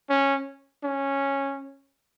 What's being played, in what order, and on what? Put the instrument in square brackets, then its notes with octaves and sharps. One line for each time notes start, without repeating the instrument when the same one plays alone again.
[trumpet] C#4
C#4